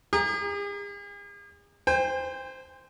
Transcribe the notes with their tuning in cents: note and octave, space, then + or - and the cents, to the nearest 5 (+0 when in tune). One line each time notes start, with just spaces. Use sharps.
G#4 -45 A#5 +0
C5 -10 G5 +40